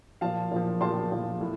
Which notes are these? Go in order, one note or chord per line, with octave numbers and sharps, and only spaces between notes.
A#2 F3 F5 A5
A#2 F3
A#2 F3 A5 C6
A#2 F3
A2